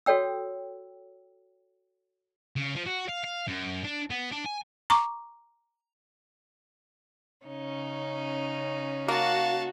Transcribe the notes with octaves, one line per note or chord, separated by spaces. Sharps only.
F#4 A4 C#5 G5 E6
C#3
F3
F#4
F5
F5
F#2
D4
B3
D4
G#5
A#5 C#6 D6
C#3 C#4 D#4
A#3 F#4 F5 A5